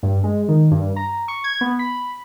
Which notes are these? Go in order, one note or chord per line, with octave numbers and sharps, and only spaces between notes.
G2
G#3
D#3
G2
A#5
C#6
G#6
B3
B5